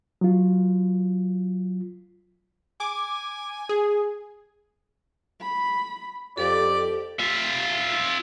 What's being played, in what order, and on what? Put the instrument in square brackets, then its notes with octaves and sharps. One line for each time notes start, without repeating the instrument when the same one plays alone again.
[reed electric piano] F#3 F4
[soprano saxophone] G#5 [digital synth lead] D6
[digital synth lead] G#4
[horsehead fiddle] B5
[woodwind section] F2 [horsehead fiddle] G4 [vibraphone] A4 [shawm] D5
[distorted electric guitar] F4 E5